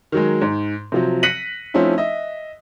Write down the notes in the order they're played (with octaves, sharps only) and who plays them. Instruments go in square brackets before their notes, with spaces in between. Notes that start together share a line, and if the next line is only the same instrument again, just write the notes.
[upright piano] D#3 F#3 G#3
G#2
C3 F3 F#3
F#6 A#6 B6 C#7 D#7 F#7
F3 A3 C4 C#4 D#4 E4
D#5 E5